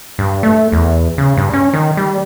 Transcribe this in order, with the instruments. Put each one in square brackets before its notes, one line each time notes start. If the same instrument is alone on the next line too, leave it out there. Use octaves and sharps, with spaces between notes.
[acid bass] G2
A3
E2
C#3
G2
C#4
D#3
G3